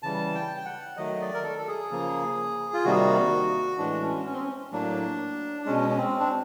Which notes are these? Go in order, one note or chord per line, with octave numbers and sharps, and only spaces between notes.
C#3 E3 G3 A5
G5
G5
F#5
D#3 F#3 A3 D#5
D5
A#4
A4
A4
G#4
C#3 F3 A#3
F4
C3 D#3 G3 A#3 F#4
A2 E3 G#3 D4
C#4
C#4
C4
C#4
A2 F#3 A#3 D4
B2 G#3 C#4
C#4
C4
D4